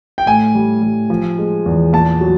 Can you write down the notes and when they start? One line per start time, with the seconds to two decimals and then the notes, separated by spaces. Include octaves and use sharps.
0.18 G5
0.26 A2 G#5
0.55 G3
0.82 G3
1.10 F3
1.38 G#3
1.66 E2
1.93 A#2 A5
2.21 F#3